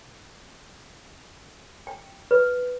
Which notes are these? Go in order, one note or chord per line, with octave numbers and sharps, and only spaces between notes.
G5
B4